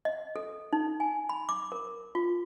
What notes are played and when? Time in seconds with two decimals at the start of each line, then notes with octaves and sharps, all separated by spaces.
0.05 D#5
0.36 A4
0.73 D#4
1.00 G#5
1.29 B5
1.49 D6
1.72 A#4
2.15 F4